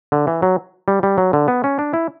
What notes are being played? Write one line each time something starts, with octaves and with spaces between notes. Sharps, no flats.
D3
E3
F#3
G3
G3
F#3
D3
B3
C#4
D4
E4